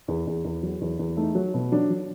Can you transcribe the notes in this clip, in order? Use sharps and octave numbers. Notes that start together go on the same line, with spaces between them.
E2
E2
E2
F#3
E2
E2
A3 D#4
F#3
B2
F#3 D4
F#3